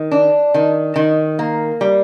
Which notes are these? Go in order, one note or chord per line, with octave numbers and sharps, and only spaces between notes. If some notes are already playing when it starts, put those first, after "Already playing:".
Already playing: D#3
D4
D#3
D#3
A#3
G3